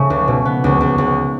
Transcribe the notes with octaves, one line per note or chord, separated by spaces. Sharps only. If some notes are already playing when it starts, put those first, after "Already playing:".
Already playing: C#3 A3
C#2
B2
B3
C#2
C#2
C#2